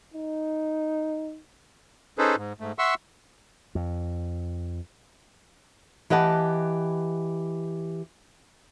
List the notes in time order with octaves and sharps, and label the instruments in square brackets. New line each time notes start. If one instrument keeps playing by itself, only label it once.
[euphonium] D#4
[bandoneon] C#4 D#4 G#4 A4 B4 C5
G#2
G#2 A3
E5 F#5 C6 C#6 E6
[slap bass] F2
[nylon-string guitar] E3 G4 D#5 F#5 A5